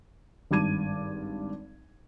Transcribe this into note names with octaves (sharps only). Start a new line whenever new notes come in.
G#1 G2 A5 D6 G#6 D#7